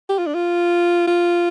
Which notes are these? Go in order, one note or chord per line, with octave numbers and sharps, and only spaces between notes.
G4
F4
D4
F4
F4